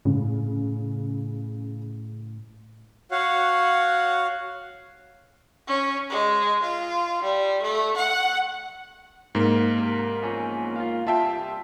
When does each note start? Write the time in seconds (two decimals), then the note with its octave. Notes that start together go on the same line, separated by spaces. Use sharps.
0.05 A2 C#3
3.11 F#4 C#5 F5 F#5
5.67 C#4
6.09 G#3
6.62 F4
7.23 G3
7.61 A3
7.95 F#5
9.35 G#2 A#3
9.78 C3
10.23 E2 F3 C#4
10.76 F4 F5
11.07 C3 G3 F4 E5 G5 A5